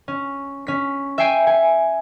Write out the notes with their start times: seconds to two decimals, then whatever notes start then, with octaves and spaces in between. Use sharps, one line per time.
0.08 C#4
0.67 C#4 B6
1.18 E5 G5 G#5 C7 D7 D#7
1.47 G#5